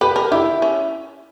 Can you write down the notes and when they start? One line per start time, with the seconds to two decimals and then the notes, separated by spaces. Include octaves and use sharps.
0.01 G4 B4
0.16 A#4
0.31 E4 G4
0.62 C#4